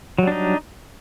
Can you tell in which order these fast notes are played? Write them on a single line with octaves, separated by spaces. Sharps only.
F#3 G3 D4 D#4